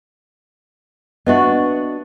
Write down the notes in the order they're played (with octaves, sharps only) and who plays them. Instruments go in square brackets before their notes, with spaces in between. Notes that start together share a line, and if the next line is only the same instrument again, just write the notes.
[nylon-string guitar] B3 D4 F#4 [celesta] D#5 E5 C#6